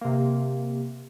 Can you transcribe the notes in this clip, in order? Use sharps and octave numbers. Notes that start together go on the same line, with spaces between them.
C3 A#3